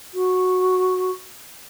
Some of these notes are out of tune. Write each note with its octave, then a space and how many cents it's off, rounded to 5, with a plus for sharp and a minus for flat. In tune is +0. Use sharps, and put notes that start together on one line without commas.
F#4 -5